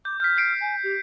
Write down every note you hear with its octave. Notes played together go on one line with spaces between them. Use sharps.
D6 G6
F6 G6 B6
G6 C7 D7
G#5
G4